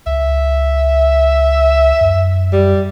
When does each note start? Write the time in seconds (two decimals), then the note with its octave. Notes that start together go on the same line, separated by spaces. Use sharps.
0.06 C#2 E5
2.01 F#2
2.52 G3